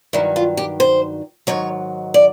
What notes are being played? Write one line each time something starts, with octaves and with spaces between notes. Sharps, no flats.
G2 D#3 F#3 E4
F4
G4
C5
G#2 D#3 F#3 C#5
D5